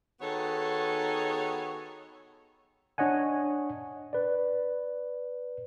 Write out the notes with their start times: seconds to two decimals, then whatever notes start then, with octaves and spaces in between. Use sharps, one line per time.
0.21 D#3 B3 F#4 G#4 A4 C#5
2.98 D4 C#5 D#5 F#5 G#5
4.13 B4 D5